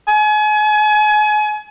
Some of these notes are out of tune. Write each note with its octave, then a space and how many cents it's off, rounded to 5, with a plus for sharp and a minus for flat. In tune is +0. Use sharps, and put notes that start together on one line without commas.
G#5 +35